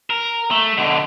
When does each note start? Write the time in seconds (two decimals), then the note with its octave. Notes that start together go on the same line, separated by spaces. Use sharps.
0.10 A#4
0.51 A3
0.78 B2 D3